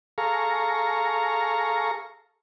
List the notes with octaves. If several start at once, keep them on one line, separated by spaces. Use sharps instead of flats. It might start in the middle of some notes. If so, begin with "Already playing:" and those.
G#4 A4 F5 A#5 C#6